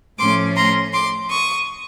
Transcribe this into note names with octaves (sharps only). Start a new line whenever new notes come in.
A2 F3 A3 C#4 C6 D6
A#5 C6
C6 D6
C#6 D#6